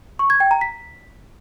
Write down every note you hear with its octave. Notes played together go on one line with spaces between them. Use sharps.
C#6
G#6
G5
A#5
B6